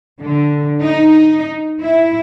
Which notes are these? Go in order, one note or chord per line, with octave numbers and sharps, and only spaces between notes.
D3
D#4
E4